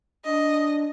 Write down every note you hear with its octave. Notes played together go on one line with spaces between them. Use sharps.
D4 D#5